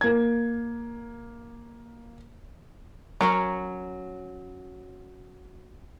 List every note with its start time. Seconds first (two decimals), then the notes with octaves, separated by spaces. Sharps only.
0.01 A#3 G#6
3.21 F#3 C#4 A#4 C#5